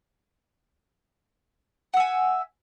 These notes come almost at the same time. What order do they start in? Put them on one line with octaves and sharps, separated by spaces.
F#5 E5 G#5